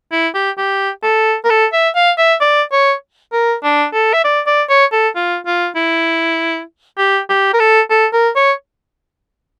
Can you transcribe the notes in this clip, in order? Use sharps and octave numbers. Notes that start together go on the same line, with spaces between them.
E4
G4
G4
A4
A#4
A4
E5
F5
E5
D5
C#5
A#4
D4
A4
E5
D5
D5
C#5
A4
F4
F4
E4
G4
G4
A#4
A4
A4
A#4
C#5